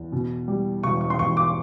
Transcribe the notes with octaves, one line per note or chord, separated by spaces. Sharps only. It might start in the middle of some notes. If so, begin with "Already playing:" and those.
Already playing: E2
B2
G3
E1 C#6
C#6
C6
E2 C#6
D6